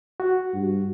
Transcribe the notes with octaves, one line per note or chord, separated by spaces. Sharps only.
F#4
G2